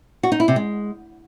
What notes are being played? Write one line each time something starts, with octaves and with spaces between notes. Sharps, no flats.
F#4
D#4
E4
C3
G#3